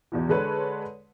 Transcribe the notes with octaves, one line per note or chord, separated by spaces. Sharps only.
E2 B2 E3
D3 G#3 A4 B4 C#5